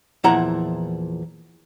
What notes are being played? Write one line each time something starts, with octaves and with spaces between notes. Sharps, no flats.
E2 A#2 F3 E4 F#5 A#5